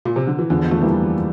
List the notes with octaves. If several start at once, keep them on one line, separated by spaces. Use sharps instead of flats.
A#2
C3
D3
E3
E2 D3 F3
F3 A3
E3 G3 A#3